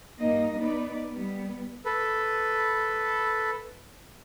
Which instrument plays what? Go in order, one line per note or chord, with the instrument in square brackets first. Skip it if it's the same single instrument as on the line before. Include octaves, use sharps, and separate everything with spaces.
[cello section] G2 A#3 D#4 D#5
B3 D#4 B4 D5
G3 B3
[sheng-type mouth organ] A4 B4